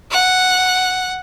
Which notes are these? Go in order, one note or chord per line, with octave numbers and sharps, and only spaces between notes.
F#5